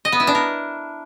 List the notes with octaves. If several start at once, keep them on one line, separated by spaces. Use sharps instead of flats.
D#5
B3
E4
D4
A#4